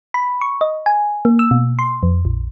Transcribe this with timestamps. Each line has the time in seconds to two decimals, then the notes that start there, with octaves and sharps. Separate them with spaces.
0.14 B5
0.41 C#6
0.61 D#5
0.86 G#5
1.25 A#3
1.39 E6
1.51 B2
1.79 C6
2.03 F2
2.25 A#1